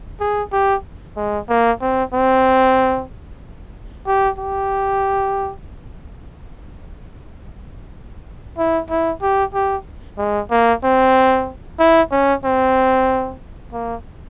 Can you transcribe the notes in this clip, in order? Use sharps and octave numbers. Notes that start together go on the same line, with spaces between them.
G#4
G4
G#3
A#3
C4
C4
G4
G4
E4
E4
G4
G4
G#3
A#3
C4
E4
C#4
C4
A#3